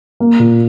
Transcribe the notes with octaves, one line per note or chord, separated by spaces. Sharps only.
A#3
A#2